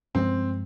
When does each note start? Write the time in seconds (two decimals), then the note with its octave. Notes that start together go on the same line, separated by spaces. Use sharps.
0.15 G2 F3 G#3 C4